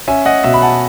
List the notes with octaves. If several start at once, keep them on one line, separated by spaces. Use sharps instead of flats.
C#4 E5 G#5
D#5 F#5
B2 E5
B5
F#5 A5